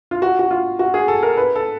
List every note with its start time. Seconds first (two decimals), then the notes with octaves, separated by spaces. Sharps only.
0.11 F4
0.22 F#4
0.39 F#4
0.51 F4
0.79 F#4
0.94 G#4
1.08 A4
1.23 A#4
1.37 B4
1.56 A4